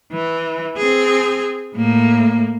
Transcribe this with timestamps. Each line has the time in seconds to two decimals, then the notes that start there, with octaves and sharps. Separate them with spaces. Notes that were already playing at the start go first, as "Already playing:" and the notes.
0.12 E3
0.77 C4 G#4
1.75 A2 A#3